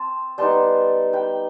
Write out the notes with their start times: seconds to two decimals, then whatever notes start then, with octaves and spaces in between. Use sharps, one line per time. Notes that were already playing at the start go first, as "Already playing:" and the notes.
Already playing: C4 A5
0.38 G3 B3 D#4 A5 C6
1.13 G5 B5